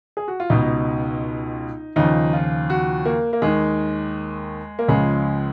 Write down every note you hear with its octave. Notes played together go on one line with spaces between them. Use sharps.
G#4
F#4
F4
C#2 B2 D#4
D#2 C#3 F3 D#4
F4
F#4
A#3
A#3
D#2 D#3 G#3
A#3
C#2 C#3 F3 G#3